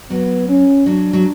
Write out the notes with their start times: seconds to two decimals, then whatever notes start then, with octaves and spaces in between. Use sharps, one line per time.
0.10 F#3 B3
0.49 C#4
0.86 F#3 D4
1.13 F#3